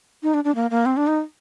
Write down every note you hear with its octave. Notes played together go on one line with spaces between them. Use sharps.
D#4
D4
D4
A#3
A#3
C4
D4
D#4